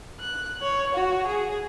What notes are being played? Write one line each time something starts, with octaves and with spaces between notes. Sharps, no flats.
F#6
C#5
F#4
G#4